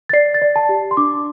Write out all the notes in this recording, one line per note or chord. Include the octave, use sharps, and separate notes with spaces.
A6
D5 C7
A6
D5
A5
G4
C6
D4 D6